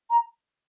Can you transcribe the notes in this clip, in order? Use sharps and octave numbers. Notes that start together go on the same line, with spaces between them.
A#5